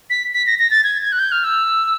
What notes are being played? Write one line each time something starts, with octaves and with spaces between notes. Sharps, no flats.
B6
B6
A#6
A#6
A6
G#6
G#6
F#6
G6
F6
E6